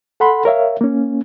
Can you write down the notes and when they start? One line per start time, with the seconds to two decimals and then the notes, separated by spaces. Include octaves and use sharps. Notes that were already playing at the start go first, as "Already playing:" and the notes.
0.20 A4 F#5 B5 C6
0.45 A#4 C#5 E5 F5
0.81 A#3 C#4